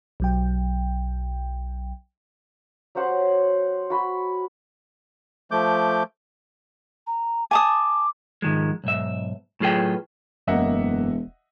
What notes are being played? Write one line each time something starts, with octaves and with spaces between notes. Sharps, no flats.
B1 F#3 G5
F#3 G4 C5 F#5
F#4 B5
F3 A3 D6 G6
A#5
G#5 A5 D6 D#6
G#2 D#3 F3 G#3
B1 G#2 E5
A2 F#3 F4 G#4 B4 G5
E1 F#2 A#3 D#5 E5 F#5